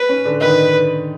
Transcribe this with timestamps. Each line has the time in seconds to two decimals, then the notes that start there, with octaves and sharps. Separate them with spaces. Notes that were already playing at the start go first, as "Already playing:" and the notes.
Already playing: B4
0.09 C#4
0.25 D3 D4
0.41 D#3 D#4 B4